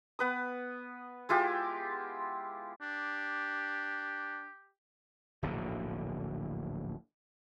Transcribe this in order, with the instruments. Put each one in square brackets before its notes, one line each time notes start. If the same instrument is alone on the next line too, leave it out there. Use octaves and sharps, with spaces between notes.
[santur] B3 B4 D#6
G#3 E4 F4 G4
[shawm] D4 [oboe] G4
[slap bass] D1 A#1 B2 D3